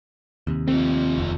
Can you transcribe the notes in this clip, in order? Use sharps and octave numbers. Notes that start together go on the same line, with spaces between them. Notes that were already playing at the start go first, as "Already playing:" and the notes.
D#2 C3
F3 A3 C4
F1 D#2